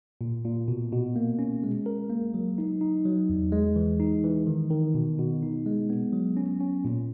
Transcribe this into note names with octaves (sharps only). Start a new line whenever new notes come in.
A#2
A#2
B2
B2
A#3
C#4
G#3
A#4
A#3
F#3
D#4
D#4
F#3
E2
G#3
E3
D#4
E3
D#3
D#3
B2
B2
D#4
G#3
B3
F#3
C#4
C#4
A#2